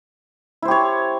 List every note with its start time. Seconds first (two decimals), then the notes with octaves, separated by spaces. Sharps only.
0.62 E4
0.65 C5
0.68 G4
0.71 C#5